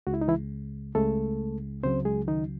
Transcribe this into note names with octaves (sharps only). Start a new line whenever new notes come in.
C#2 C#3 G#3 F#4
E4
D#4
E3 E4
C#2 C#3 G#3 A3 A4
C#2 C#3 F#3 C4 C5
G#3 G#4
D#3 D#4